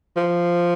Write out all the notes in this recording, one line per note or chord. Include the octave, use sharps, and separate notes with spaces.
F3